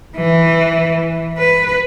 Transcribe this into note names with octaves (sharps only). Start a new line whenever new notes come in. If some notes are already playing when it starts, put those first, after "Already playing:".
E3
B4